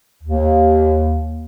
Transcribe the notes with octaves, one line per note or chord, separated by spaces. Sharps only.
D#2